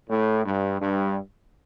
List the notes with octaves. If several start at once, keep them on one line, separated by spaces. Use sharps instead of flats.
A2
G2
G2